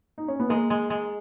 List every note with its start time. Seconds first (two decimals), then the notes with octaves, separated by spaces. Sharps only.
0.18 D#4
0.28 C#4
0.40 B3
0.49 G#3 A#3
0.70 G#3
0.90 G#3